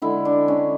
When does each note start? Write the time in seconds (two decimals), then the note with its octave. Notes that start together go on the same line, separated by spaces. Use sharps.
0.02 D3 G#3 E4
0.25 D4
0.48 C#4